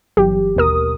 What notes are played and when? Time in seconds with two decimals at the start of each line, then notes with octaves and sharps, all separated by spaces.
0.17 G1 E3 F#3 G4
0.56 D#2 B2 A#4 D#6